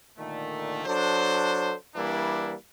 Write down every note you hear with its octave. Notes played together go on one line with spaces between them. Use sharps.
A#2 D3 D#3 A3
F#3 D4 A4 C5
E3 G3 A#3 D4 E4